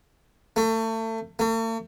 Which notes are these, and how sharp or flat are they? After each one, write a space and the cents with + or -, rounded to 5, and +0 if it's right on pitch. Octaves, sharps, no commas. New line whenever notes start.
A3 +30
A3 +45